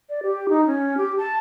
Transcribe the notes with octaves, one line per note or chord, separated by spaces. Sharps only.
D5
G4
D#4
C#4
G4
A5